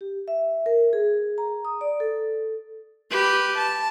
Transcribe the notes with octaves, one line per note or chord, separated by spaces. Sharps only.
G4
E5
A#4
G#4
A#5
D#6
D5
A4
G4 B4
A5